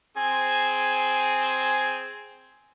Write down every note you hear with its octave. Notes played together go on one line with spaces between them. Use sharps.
C4 G#4 G#5